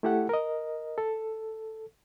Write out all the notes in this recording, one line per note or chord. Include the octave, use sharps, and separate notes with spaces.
A3 E4 G4 A4 F#5
A#4 D#5
A4